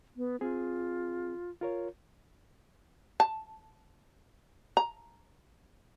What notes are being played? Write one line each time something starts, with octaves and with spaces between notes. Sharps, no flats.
B3
C4 F4 G#4
F4 A#4 C#5
A5
A#5